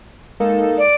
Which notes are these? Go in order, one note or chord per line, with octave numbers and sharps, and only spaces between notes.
G#3 A#3 D#4 A4
D5